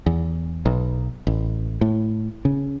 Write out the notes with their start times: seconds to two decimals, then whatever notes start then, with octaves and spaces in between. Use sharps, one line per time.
0.06 E2
0.66 B1
1.27 A1
1.81 A2
2.45 C#3